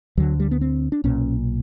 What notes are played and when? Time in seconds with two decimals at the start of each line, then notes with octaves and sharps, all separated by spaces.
0.17 D2 D3 F#3
0.40 G3
0.51 B3
0.61 C4
0.92 D4
1.04 B1 A#2 C#4